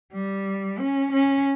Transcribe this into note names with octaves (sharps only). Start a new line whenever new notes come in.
G3
C#4
C#4